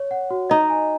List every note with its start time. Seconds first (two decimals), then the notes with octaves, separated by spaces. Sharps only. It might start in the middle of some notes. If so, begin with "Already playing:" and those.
Already playing: C#5
0.11 F#5
0.31 F#4
0.50 D#4 D#5
0.70 G#5